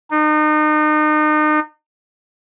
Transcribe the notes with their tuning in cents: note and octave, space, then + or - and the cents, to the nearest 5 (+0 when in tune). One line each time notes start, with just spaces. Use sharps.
D#4 -35